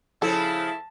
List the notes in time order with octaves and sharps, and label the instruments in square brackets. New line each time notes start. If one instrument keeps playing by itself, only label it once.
[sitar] C#3 F3 [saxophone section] E4 [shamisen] A4 [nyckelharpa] A5